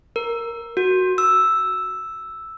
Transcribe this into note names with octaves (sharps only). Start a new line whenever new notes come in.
A#4
F#4
E6